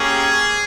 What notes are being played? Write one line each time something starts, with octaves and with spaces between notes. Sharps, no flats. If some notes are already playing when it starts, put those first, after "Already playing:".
Already playing: A#3 C#4 G4 G#4